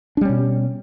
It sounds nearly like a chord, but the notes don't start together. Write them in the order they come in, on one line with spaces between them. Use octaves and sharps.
D4 G3 C#4 B2